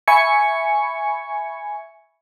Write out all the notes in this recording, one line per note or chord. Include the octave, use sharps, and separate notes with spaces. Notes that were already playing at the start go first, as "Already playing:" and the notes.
E5 G#5 B5 C#6 G#6 C#7